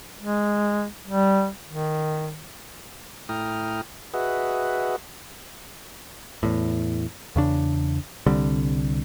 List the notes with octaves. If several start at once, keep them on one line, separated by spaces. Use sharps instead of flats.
G#3
G3
D#3
A2 E4 G5 A#5 D#6 F6
F#4 G#4 B4 D#5 E5 F#5
E2 A2
E2 C#3 D4
C2 D3 G3 C4